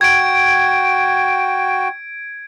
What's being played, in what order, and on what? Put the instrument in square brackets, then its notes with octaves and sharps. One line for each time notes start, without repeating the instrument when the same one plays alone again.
[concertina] F#4 G5 [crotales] G#6 D7